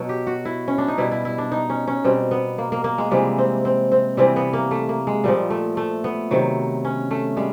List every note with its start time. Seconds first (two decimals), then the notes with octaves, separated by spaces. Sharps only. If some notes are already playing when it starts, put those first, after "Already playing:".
Already playing: B2 F#3
0.09 G4
0.27 F#4
0.45 E4
0.68 C#4
0.78 D4
0.88 D#4
0.98 B2 G3 E4
1.11 E4
1.25 E4
1.38 D4
1.52 D#4
1.70 C#4
1.88 C#4
2.04 B2 G3 C4
2.31 B3
2.58 A#3
2.72 A#3
2.84 A#3
2.98 G#3
3.11 C3 E3 G3 G#3
3.38 C4
3.65 C4
3.92 C4
4.17 C3 E3 G3 C4
4.36 B3
4.53 A#3
4.71 A3
4.89 A#3
5.07 G#3
5.24 A#2 F3 G3
5.50 A3
5.77 A3
6.04 B3
6.31 C3 D#3 F#3
6.85 C#4
7.11 A3
7.37 G3 G#3